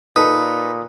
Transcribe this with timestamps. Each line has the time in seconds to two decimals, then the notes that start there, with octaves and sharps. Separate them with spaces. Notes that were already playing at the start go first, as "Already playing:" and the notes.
0.16 A#2 D#4 A4 B4 D#6